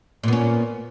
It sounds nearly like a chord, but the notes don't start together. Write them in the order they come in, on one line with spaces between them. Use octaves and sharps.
A#2 B3 C#4